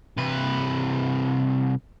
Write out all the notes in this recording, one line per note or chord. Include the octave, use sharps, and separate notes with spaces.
C2 B4